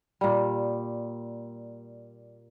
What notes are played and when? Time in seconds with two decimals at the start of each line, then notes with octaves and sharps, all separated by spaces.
0.21 A#2 G3